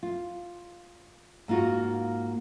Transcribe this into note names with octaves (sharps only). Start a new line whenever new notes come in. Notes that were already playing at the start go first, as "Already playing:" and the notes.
F4
G#2 A#3 D#4 F4 F#4